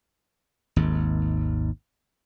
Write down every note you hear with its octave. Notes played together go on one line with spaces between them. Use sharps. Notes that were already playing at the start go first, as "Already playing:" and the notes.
G#1 D#2